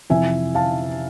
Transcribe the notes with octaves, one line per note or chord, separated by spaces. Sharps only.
F2 C3 E3 E5 G#5
F5 A5